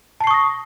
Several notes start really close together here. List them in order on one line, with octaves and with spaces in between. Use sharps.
A5 C7 C#6 D#6 A#6